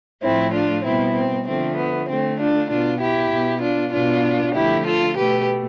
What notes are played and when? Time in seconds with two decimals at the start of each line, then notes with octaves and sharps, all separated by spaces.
0.23 A2 F3 A3 C4 E4
0.54 D4 F4
0.84 B2 G3 B3 C4 E4
1.15 C4
1.46 D3 F3 A3 C4
1.77 B3
2.08 D3 A3 C4
2.39 D4 F4
2.70 B2 B3 D4 F4
3.01 E4 G4
3.31 B2 B3
3.62 D4 F4
3.93 B2 B3 D4 F4
4.54 D3 F3 A3 E4 G4
4.86 F4 A4
5.16 B2 A3 G4 B4